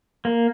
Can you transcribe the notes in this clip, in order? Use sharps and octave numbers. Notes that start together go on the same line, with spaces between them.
A#3